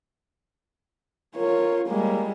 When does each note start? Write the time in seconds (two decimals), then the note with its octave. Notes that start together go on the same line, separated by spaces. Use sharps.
1.36 F4 A#4 C#5
1.88 G3 G#3 A#3